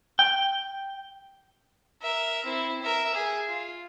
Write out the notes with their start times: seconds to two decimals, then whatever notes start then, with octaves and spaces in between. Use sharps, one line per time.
0.19 G5
2.02 A#4 E5
2.45 C4 E4
2.82 A#4 E5
3.14 G#4
3.48 F4